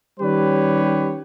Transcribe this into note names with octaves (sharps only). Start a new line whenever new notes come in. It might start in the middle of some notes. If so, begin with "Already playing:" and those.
D#3 G3 C#4 G4 B4 C#5